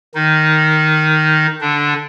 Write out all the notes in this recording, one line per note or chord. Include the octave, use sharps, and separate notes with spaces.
D#3 D#4
D3 D4